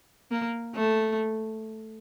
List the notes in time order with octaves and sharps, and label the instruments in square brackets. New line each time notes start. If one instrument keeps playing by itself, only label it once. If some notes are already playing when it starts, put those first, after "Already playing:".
[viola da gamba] A#3
A3